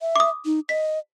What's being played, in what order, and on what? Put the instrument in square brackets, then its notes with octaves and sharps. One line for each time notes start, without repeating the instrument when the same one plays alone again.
[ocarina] E5
[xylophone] D6 D#6
[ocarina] D#4
[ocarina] D#5 [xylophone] B6